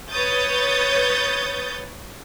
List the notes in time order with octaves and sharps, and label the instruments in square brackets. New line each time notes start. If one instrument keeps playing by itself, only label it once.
[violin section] B4 C#5 D#6 G6 A6